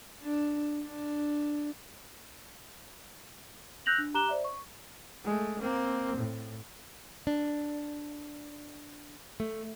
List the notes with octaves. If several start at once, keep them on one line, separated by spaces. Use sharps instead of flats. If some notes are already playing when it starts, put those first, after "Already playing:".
D4
D4
E6 F#6 G6 A#6 F7 F#7
D4
G4 A#5 D6 F#6 E7 G7
C5 D5 E5
C#6
G#3 A3
A#3 C4
A2
D4
A3